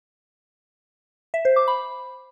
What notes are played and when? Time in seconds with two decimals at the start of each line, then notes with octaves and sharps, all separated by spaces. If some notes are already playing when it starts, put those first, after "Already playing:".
1.34 E5
1.45 C5
1.56 D6
1.68 B5